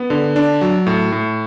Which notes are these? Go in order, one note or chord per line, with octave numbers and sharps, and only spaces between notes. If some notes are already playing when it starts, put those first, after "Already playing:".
Already playing: B3
D3
D4
F#3
A2
A2